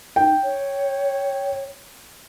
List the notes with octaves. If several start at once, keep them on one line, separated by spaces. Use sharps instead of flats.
D#4 G5
C#5